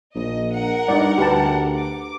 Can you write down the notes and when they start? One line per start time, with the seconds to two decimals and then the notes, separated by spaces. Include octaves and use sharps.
0.15 A#1 D#5
0.55 A#4 F#5
0.88 G2 D#4 D5
1.18 D2 G4 B4 A5
1.76 D6